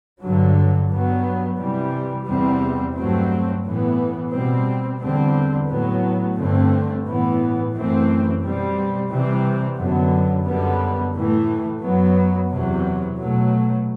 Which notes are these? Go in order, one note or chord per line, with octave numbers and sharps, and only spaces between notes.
G2 D3 F#3
G2 F#3 B3
C3 E3 G3
E2 C3 G3 C4
G2 F#3 A3 C4
A2 E3 B3
B2 G3 C4
E2 D3 G3 C4
A2 F#3 B3
G2 D3 A3 C4
A2 E3 B3
F#2 E3 A3 C4
B2 G3 C4
C3 E3 G3 C4
F#2 D3 F#3 B3
F#2 D3 G3 B3
A2 E3 A3
F#2 F#3 B3
E2 C3 F#3
B2 F#3 A3